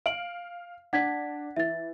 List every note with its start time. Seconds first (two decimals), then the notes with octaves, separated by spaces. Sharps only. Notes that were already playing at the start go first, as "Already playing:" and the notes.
0.06 F5 D7 F#7
0.93 D4 F#5 G#6 B6
1.57 E3 E5 A6